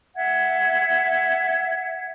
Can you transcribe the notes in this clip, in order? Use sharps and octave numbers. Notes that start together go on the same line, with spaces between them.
E5 F#5 G#6